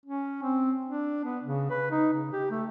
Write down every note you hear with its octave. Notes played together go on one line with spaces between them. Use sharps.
C#4
C4
D4
B3
C#3
B4
D#4
C#3
G4
A3